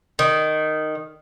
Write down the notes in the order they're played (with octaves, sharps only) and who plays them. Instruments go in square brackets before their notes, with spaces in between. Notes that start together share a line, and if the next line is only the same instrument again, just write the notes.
[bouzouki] D#3